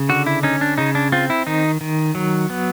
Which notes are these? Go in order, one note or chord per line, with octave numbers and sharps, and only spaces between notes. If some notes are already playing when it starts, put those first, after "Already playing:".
Already playing: C#3
D3 F#4
E4
C#4 D#4
D4
C#3 D#4
D4
C4 F4
E4
D#3 D#4
D#3
F#3
B3